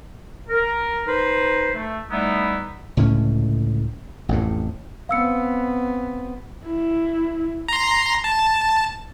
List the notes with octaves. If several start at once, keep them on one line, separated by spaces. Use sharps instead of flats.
A#4
D#4 B4 C5
A3
G3 A3 B3 D#4 E4
C#2 A2 D3 C#4
A1 F2 A2
B3 C4 F5 E6 C#7
E4
A#5 C6
A5